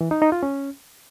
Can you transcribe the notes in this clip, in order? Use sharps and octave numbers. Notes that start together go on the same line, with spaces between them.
E3
D#4
D#4
F4
C#4